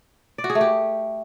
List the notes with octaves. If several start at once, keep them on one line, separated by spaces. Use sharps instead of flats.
D5
F#4
G#4
A3
G4